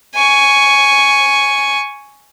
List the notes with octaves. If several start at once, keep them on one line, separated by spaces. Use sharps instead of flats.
G#5 C#6